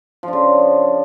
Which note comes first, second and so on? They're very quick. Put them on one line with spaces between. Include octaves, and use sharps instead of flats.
F3 D4 C#3